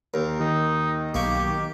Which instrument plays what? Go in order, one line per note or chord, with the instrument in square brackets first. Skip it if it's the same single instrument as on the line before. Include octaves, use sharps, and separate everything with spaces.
[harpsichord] D#2 [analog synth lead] A#4
[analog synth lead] D#3 [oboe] D#4
[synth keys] B1 C#6 [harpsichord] A#3 [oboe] G4